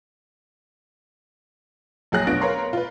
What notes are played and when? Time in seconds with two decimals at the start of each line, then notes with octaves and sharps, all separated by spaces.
2.12 A#1 F#3 G#4 F#6 A#6
2.27 B2 B3 D4 F4 A#6 D7
2.41 A#4 B4 C#5 F5 A#5 C6
2.73 F4 B4